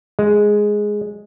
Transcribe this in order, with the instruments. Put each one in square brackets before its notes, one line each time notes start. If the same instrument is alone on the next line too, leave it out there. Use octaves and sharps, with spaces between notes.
[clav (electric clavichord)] G#3